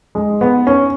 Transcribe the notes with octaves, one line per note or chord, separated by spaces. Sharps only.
G#3
B3
C#4